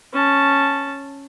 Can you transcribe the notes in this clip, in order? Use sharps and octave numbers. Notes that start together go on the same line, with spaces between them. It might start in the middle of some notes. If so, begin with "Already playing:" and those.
C#4 A5